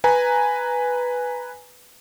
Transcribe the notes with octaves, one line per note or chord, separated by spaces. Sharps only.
B4 G#5 A#5